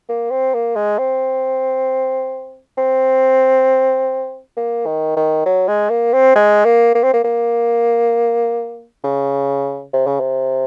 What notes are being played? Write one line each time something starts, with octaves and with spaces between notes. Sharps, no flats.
A#3
C4
A#3
G#3
C4
C4
A#3
D#3
D#3
F#3
G#3
A#3
C4
G#3
A#3
A#3
C4
A#3
A#3
C#3
C3
C#3
C3